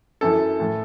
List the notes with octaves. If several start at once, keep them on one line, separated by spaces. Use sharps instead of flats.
F#2 E3 A4
A2 E3